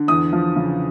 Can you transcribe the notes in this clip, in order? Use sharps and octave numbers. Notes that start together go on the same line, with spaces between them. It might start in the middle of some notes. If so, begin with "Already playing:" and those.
Already playing: D3
E2 D#6
F3
C#3